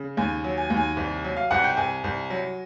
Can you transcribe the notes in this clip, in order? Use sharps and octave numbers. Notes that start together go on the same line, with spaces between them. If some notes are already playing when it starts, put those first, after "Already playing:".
Already playing: C#3
D#2 G#5
F#3
G#5
D#2
G#5
C2
F#3
F5
C2 F#5
G5
C2 G#5
C2
F#3